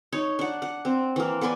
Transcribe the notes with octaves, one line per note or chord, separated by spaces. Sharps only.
D#4 C#5
D4 F#5
F#5
C4
E3 A#3
B3 B4 D5 G#5